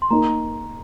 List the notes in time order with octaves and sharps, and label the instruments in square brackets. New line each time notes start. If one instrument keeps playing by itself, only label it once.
[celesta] C6
[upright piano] A#3 D#4 A#4 [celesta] A#5